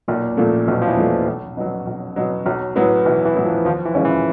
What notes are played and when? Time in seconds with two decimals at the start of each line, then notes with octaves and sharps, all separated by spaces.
0.08 B1 A#2
0.37 A#2 F3 A3
0.67 B1 B2
0.82 F3
0.88 E3
0.97 A#2 F3 A3
1.27 B1
1.57 B2 F#3
1.87 B1
2.16 B2 F#3
2.46 B1 F#3
2.75 A2 F#3 B3
3.05 B1 E3
3.25 E3
3.35 A2 F#3 B3
3.46 F3
3.65 D#2 F3
3.85 E3
3.94 D#3 G#3 C#4 F4
4.05 E3